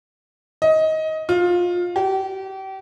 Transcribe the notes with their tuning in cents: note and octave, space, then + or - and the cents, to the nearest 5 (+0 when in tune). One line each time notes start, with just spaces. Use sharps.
D#5 +20
F4 +20
G4 -35